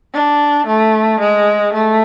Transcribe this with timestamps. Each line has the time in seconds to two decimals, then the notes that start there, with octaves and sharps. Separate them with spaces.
0.14 D4
0.67 A3
1.20 G#3
1.73 A3